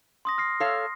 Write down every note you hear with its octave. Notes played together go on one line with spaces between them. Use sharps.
C6 D#6 A#6
F6 A#6 C7
A4 C#5 F5